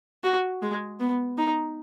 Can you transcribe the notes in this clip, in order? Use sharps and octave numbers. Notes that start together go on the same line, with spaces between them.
F#4
G#3
B3
D#4